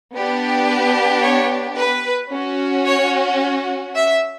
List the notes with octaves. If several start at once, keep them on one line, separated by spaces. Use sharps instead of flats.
B3 D4 G4
B4
C#5
B4
C#4 F#4
C#5
E5